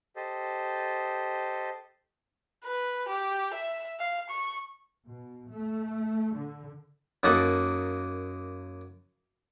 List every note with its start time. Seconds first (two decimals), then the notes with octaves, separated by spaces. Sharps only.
0.16 G4 A4 C5 D#5
2.64 B4
3.08 G4
3.54 E5
4.00 F5
4.30 C#6
5.08 B2
5.50 A3
6.35 D3
7.23 F#2 A#3 D#4 A4 F#5 C#6